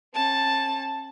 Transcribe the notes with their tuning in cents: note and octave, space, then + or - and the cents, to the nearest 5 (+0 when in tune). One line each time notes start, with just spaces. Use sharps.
C#4 -40 A5 +0